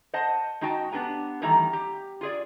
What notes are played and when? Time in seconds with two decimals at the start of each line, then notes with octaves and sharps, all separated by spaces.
0.14 C5 D#5 F#5 A5
0.61 G#3 D#4 F#4 G5 A5
0.92 B3 D4 G4 G#5 A#5
1.42 D#3 E3 G3 A3 A#5
1.73 G4
2.21 F4 G#4 D5